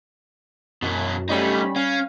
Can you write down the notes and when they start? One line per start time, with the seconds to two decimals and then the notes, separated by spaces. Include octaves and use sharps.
0.82 F#2 B2 E3
1.29 G3 A3 C#4 D#4 B5
1.76 C#4 F5